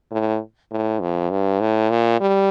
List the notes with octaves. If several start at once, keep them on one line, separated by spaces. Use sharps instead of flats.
A2
A2
F2
G2
A2
A#2
G3